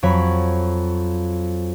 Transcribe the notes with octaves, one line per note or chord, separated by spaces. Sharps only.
F2 F#3 C#5 B5